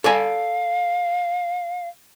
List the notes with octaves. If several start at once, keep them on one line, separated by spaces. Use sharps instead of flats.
A4 D5 F5 G#5